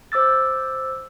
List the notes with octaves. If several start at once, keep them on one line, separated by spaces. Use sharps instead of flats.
C5 D6 E6 A6